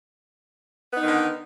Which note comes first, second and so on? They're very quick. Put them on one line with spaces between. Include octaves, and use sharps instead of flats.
B3 D#4 D#3 D3